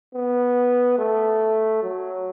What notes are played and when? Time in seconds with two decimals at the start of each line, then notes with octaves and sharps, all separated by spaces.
0.14 B3
0.98 A3
1.83 F#3